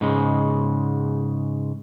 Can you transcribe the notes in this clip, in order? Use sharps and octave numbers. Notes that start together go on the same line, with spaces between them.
G#2 C#3 G#3